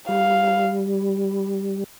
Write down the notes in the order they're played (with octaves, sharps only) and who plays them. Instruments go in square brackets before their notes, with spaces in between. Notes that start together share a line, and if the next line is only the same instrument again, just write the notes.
[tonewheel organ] G3 [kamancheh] F5